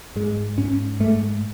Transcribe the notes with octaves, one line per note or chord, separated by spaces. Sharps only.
G#2 G#3
G#2 C#4
G#2 A3